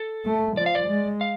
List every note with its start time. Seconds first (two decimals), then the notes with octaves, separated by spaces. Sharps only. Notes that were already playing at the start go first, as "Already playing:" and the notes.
Already playing: A4
0.26 A3
0.57 F3 D5
0.66 F5
0.75 D5
0.89 G#3
1.21 F5